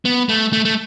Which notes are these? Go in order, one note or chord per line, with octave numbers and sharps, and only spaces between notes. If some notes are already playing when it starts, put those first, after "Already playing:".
B3
A3
A3
A3